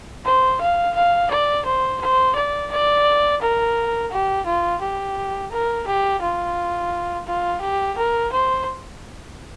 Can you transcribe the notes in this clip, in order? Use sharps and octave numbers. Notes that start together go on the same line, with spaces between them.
C5
F5
F5
D5
C5
C5
D5
D5
A#4
G4
F4
G4
A#4
G4
F4
F4
G4
A#4
C5